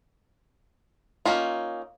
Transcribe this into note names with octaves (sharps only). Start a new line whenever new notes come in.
A#3 C#4 D#4 F4